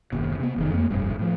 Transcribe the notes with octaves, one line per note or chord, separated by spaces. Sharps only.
F#1 D#2 B2
C3 B3
F1 E2 A#2 D#3
F2 A3 A#3
F1 A#1 G2 B2
A2 F3